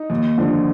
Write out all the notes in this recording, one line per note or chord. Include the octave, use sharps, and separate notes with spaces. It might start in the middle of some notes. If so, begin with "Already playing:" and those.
Already playing: D#4
D#2
D3 F3